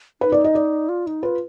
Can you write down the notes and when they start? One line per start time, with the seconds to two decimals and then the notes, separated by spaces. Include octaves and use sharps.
0.21 D#4 B4
0.32 D5
0.44 D#5
0.55 D5
0.89 F4
1.07 D#4
1.23 F4 B4